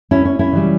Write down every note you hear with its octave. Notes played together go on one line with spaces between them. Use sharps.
C#4 E4
C#4
C#4 E4
C#3 E3 G3